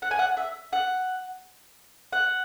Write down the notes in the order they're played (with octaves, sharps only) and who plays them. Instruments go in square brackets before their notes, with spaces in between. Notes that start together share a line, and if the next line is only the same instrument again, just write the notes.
[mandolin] F#5
G#5
F#5
E5
F#5
F#5